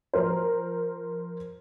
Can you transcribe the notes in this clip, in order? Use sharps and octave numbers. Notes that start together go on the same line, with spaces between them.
F3 A#4 C5